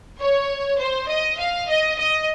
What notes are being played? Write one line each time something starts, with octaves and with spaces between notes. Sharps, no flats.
C#5
C5
D#5
F5
D#5
D#5